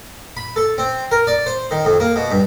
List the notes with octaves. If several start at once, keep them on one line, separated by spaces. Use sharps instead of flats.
B5
A4
C4
A#4
D5
C5
D#3
F2
A#3
B2
G2